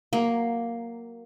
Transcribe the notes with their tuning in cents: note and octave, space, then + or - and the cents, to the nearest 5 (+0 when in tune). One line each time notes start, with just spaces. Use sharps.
F#3 +0 A#3 +0